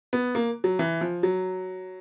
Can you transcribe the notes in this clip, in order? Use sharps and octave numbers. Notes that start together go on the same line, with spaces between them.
B3
A#3
F#3
E3
F3
F#3